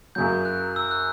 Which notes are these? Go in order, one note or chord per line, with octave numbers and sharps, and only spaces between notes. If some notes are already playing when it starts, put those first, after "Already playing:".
F#2 C#3 F#3 G6
F#6
E6
F#6